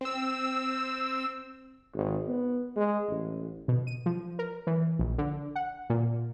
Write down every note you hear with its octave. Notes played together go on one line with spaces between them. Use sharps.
C4 E6
G#1
B3
G#3
A1
B2
D#7
F3
A#4
E3
A#1
D3
F#5
A#2